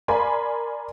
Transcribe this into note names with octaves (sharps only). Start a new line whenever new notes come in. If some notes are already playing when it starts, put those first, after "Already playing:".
A#4 D5 G#5 B5 C6